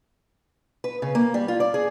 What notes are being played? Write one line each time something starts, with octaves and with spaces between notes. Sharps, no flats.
B4
C#3
A#3
G3
F4
D5
G#4